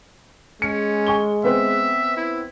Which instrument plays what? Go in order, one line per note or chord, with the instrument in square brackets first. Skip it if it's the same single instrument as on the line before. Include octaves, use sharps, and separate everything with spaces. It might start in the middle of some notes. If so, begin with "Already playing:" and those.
[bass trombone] G#3 [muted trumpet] C#4 [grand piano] C#7
[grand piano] G#5 C#6 G7
[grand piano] B3 C4 B4 [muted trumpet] E5
[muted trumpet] E4